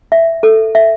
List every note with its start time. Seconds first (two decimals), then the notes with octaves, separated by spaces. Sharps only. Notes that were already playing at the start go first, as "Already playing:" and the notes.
0.12 E5
0.43 A4
0.75 E5